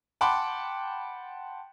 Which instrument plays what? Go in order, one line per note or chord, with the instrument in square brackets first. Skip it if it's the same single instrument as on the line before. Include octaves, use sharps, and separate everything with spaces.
[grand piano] F#5 G5 A5 B5 C6 D6